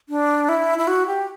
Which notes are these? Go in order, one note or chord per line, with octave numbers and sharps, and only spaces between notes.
D4
E4
E4
F#4
G4